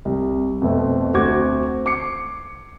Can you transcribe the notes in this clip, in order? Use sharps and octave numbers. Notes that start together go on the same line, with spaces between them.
C2
F2 B2 A3 C4
D2 C4 F#4 F#5 D6 G#6
D6 C7 C#7